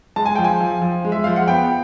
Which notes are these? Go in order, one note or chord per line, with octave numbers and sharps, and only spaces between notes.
G#3 A5
G#5
F3 G5
G#5
F3
F3
G#3
E5
F3 F5
F#5
B3 G5